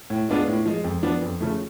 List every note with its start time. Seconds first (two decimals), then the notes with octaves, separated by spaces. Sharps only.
0.10 A2
0.29 G#3 B3 D4 F4
0.48 A2
0.65 F3 G#3
0.84 F2
1.03 F3 B3 D4
1.22 F2
1.41 C#3 F3 A3